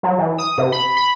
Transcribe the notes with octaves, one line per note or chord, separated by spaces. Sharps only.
F#3
E3
D#6
C3
B5
B5